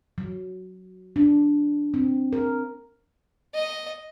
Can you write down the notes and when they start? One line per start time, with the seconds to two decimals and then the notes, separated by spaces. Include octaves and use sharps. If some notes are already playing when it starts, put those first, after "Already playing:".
0.18 F#3
1.16 D4
1.94 C4
2.33 A#4
3.54 D#5